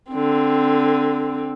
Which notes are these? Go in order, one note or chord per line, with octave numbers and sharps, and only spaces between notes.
D3 C4